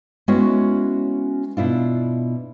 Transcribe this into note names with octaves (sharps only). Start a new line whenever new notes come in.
G#3 B3 C#4 E4 F#4 C#5
B2 D4 E4 F4